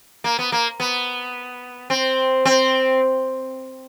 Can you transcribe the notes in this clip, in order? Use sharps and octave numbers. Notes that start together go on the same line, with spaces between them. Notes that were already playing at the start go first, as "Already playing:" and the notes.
A#3
B3
A#3
B3
C4
C4